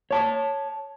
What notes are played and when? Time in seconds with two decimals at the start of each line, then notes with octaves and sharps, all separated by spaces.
0.11 C#5 A5